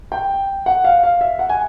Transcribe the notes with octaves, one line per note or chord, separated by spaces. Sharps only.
G5
F#5
F5
F5
E5
F#5
G#5